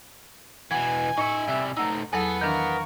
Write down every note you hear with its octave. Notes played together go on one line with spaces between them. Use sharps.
B2 E3 F#5 G#5 G#6
A2 D#4 E5 C#6
C2 G3 E5
A3 D#4 F#5 A#5 E6
E2 F#3 B3 G#4 A4 F#5
D#3 E3 A#3 D4 A#4 C#6